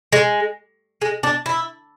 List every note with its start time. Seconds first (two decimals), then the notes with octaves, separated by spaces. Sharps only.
0.12 G#3
1.02 G#3
1.23 D4
1.46 E4